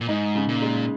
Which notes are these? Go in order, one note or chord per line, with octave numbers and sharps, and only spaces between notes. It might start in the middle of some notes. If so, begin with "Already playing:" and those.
A#2
G#2 D#4
C#3
A#2
G#3